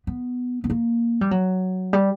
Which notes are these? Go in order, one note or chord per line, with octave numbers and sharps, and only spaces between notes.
B3
B3
A#3
G3
F#3
G3